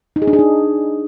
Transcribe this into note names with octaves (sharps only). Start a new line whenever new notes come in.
D#4
G#4
D4
G#4
D#4